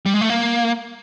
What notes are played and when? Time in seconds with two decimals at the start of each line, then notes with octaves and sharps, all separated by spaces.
0.06 G3
0.14 G#3
0.21 A3
0.30 A#3